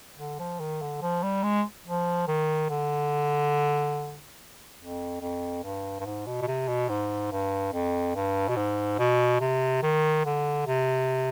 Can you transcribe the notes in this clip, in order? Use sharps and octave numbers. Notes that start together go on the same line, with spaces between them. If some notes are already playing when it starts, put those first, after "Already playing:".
D3
F3
D#3
D3
F3
G3
G#3
F3
D#3
D3
F2
F2
G2
G2
G#2
B2
B2
C3
B2
G#2
G2
F2
G2
B2
G#2
B2
C3
D#3
D3
C3